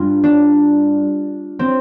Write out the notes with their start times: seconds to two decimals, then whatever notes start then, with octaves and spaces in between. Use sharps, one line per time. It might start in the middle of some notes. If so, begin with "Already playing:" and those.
Already playing: G2 F4
0.24 D4
1.59 C4